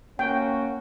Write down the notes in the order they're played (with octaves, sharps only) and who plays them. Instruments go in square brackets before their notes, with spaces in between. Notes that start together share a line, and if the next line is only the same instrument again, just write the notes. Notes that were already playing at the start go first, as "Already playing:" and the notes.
[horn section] A#3 C#4 F#4 [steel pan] G5